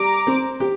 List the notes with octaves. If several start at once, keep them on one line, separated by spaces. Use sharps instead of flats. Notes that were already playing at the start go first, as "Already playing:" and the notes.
Already playing: G3 A#5 D6
C4
G4